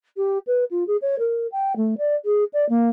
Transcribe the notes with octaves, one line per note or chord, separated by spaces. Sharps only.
G4
B4
F4
G#4
C#5
A#4
G5
A3
D5
G#4
D5
A#3